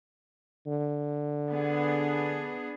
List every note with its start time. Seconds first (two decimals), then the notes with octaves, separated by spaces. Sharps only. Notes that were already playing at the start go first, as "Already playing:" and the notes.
0.67 D3
1.49 B3 D4 G#4